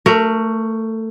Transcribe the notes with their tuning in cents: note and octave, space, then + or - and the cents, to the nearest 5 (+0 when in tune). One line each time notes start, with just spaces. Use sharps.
A3 +20 A#4 +0